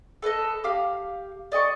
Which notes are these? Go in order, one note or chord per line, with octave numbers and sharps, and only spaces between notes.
A4 B4 D5 D#5
G4 F5
D5 D#5 G#5 C#6